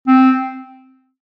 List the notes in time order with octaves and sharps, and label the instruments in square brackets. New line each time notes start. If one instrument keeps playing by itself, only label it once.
[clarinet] C4